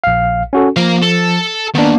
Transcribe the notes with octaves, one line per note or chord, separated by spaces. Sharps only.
A#1 F5
C#4 F#4 A4
F3 A#3 F5
A4
D#3 A#3 B3 D4